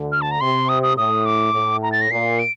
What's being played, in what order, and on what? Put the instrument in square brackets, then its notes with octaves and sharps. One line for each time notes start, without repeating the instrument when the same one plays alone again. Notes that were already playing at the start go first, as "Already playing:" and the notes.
Already playing: [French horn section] D2 D3
[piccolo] F6
A5
A#5
[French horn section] C3 [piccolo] C6
[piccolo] D#6
D#6
[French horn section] A2 [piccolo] D#6
[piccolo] D6
[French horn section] A2
[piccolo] A#5
A6
A#6
[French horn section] A#2 [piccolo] C7
[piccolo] D7